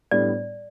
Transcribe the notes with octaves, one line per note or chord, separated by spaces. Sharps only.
A2 G3 B3 D4 D5